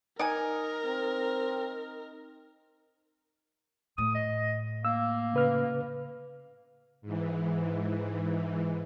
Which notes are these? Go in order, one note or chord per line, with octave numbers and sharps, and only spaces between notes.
D#4 A#4 D5 F#5 G#5
C4
A2 D#6
D#5
A#3 E6
C#3 B4 F6
G#2 E3